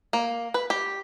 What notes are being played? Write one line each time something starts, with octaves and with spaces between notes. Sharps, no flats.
A#3
B4
G4